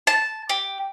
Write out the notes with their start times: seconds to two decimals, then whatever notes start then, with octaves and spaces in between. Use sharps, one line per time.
0.07 A5
0.49 G4